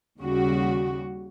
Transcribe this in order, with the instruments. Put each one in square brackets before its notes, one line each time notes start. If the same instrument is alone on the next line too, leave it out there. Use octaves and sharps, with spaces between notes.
[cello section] D#2 C#3 G3 F#4